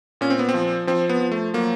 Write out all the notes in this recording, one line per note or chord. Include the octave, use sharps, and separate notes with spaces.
A#2 C#4
C4
B3
C4
F3
F3 C4
B3
F3
A3
F#3 A#3